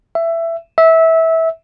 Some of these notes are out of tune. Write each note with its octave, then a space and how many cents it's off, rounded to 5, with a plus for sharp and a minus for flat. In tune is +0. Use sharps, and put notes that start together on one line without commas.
E5 +15
E5 -20